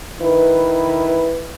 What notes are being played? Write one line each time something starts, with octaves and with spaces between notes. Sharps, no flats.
D#3 E4 B4